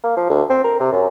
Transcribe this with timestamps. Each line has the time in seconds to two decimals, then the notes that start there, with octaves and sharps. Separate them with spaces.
0.03 A#3
0.17 F3
0.30 D2
0.50 C4
0.64 A#4
0.80 C3
0.92 F#2